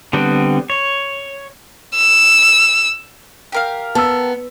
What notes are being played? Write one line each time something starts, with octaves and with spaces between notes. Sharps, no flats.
D3 G3 B3 C4
C#5
E6
G4 A#4 F5
B3 A5 E6